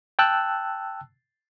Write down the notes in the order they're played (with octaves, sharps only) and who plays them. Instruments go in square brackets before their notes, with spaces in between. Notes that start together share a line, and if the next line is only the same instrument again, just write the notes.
[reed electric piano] G5 A5 E6 F#6